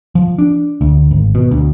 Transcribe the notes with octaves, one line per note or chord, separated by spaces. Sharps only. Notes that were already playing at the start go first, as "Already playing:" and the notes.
F3
D4
D2
G#1
B2
D2